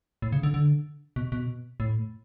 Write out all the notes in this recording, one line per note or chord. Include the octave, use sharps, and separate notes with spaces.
A2
C#3
D3
D3
B2
B2
A2